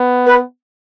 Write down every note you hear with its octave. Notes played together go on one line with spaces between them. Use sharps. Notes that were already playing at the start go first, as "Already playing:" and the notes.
Already playing: B3
B4